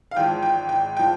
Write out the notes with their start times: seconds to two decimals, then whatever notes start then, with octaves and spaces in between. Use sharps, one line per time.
0.11 F5
0.16 G#1 G#2 F3 G5
0.42 G5
0.69 G5
0.97 F3 G5